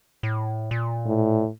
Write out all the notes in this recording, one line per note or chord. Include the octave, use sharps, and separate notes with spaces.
A2
A#2
A2